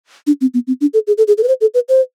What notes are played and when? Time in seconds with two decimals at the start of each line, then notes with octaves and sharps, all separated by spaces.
0.27 D4
0.41 C4
0.54 B3
0.67 C4
0.81 D4
0.94 A4
1.07 G#4
1.18 A4
1.28 G#4
1.38 A4
1.43 B4
1.48 C5
1.61 A4
1.74 B4
1.89 C5